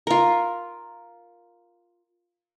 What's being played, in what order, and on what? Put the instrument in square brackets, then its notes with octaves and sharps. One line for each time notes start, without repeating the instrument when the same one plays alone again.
[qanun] F4 A#4